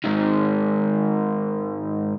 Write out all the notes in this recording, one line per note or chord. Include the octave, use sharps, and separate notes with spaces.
G#2 D#3